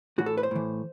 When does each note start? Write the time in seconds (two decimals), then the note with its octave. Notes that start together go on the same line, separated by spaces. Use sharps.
0.18 A2 E3 F#4
0.26 A4
0.38 B4
0.43 C5
0.51 A2 E3